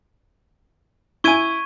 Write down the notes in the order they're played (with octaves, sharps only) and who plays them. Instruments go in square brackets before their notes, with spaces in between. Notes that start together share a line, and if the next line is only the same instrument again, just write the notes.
[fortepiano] E4 G#5 [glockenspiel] C#6 G#6 D#7